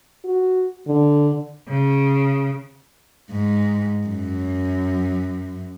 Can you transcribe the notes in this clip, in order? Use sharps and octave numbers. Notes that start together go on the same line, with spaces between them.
F#4
D3
C#3
G#2
F#2